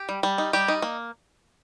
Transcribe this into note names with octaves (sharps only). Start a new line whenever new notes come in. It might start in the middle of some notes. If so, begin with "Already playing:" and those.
Already playing: G4
G3
G3
D#4
G3 G4
D#4
A#3